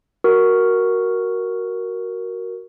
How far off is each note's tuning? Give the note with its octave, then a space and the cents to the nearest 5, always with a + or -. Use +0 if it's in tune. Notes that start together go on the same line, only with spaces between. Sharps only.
F#4 +5 A#4 +0